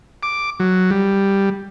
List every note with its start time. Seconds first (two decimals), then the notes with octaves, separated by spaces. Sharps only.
0.23 D6
0.60 F#3
0.91 G3